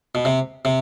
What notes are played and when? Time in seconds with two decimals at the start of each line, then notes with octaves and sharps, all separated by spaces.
0.15 B2
0.25 C3
0.65 C3